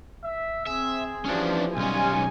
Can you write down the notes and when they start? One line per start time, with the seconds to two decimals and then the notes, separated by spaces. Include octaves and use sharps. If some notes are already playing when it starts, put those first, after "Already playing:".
0.24 E5
0.67 C4 G#4 E5
1.26 E3 F3 C#4 D4 G4
1.77 B1 G3 C#4 D#4 F4 G#5